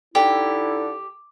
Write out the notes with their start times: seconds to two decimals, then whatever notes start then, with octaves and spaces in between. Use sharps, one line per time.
0.15 D3 D#4 E4 G4